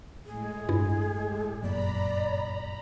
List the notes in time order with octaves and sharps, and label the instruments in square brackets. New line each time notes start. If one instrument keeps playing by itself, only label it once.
[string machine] A2 G#3 [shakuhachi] G#4
[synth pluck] G2 E4
[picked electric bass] G1 F#2 A#2 [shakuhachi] D5 [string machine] A#5 B5